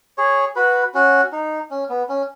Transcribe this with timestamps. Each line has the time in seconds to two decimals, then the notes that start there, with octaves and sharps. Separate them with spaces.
0.18 G#4 C#5
0.56 F#4 B4
0.94 C#4 F#4
1.32 D#4
1.71 C#4
1.89 B3
2.09 C#4